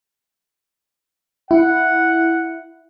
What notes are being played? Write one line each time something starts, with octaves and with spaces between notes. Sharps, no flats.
E4 F#5